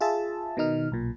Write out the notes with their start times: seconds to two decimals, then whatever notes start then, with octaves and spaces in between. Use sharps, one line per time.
0.01 F4 G#4 E5 A5
0.57 B2 D#3 D#4 F6
0.92 B1 A#2